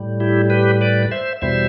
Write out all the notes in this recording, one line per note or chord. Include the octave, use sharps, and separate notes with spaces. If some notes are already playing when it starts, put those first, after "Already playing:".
Already playing: A2 G3
E4 G4
G4 B4
B4 D5
C5 E5
E2 B2 G3 C5 E5